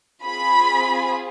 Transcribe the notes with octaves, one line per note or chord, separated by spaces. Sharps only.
C4 F4 G#4 B5